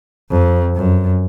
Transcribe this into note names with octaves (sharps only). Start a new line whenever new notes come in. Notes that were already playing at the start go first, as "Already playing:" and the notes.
F2
F#2